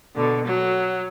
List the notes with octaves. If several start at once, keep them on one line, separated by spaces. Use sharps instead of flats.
B2 D3
F#3